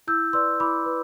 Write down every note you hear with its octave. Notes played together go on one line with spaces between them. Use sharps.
E4 E6 G6
B4 D5 C6 E6
E4 B5 D6
B4